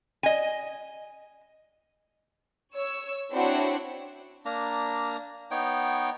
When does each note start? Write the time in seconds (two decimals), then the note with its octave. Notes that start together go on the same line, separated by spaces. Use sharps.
0.23 D#5 G#5
2.74 C#5 E6
3.32 C4 D4 E4 F#4 C#5 F#5
4.45 A#3 D4 A#5
5.51 B3 D#4 C#5 G5